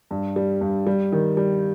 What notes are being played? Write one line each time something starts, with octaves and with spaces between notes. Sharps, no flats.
G2
G3
G2
G3
D#3
G3